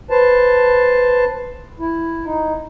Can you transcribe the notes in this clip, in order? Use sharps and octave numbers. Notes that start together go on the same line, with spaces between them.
B4 C5 A5
E4
D#4